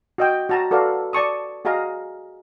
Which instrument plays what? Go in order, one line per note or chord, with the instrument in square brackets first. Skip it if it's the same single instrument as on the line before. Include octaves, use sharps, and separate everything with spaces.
[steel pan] F#4 D#5 G5
F#4 A5 A#5
F#4 A4 B4 D5 F5
D5 A5 C#6 D#6
F#4 G#4 D#5 F5 A#5